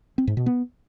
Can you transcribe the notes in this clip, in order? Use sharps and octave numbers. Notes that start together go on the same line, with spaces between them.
C4
G#2
B2
B3